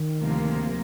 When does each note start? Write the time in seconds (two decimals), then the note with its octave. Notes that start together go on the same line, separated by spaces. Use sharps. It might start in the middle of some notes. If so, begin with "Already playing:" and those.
Already playing: D#3
0.19 D2 C3 F3 A#3